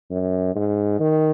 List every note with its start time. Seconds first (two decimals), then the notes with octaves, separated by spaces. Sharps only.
0.11 F#2
0.55 G#2
1.00 D#3